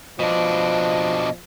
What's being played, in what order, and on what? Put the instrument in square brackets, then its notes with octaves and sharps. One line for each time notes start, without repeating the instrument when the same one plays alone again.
[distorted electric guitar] B2 D4 [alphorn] F3 [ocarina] D#5